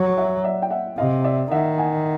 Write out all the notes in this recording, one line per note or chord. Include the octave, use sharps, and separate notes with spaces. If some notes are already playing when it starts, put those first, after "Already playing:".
Already playing: F#3
E5 F#5
D5 E5
G5
E5 F#5
C3 D#5 F5
D5 E5
D#3 E5 F#5
F#5 G#5